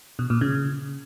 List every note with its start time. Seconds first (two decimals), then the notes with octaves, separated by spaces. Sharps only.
0.19 B2
0.30 A#2
0.41 C#3